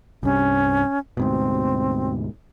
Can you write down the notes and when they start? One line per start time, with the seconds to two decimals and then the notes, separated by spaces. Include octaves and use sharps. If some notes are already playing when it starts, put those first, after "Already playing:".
0.23 C2 G2 C3 C#4
1.17 D2 G#2 B2 C4